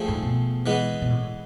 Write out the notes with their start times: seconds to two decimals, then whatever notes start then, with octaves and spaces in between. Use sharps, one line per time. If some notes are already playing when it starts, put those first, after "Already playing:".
Already playing: F3 A3 C4 G#4
0.08 G#2
0.22 B2
0.66 E3 G#3 B3
1.01 B2
1.10 A2